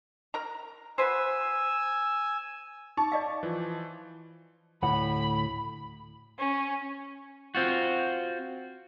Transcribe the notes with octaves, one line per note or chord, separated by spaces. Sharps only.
A#4 A#5
F#4 B4 C5 G#5 E6
D#4 A5 C#6 D6
D5 D#5 F5
E3 F3
D2 A2 F#5 B5
C#4
C4 F4 F#4